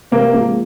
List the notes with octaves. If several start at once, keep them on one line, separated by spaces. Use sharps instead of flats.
C3 A#3
F3 G#3